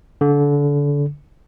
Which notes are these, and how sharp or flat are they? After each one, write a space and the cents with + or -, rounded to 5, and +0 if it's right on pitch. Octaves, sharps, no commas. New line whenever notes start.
D3 -30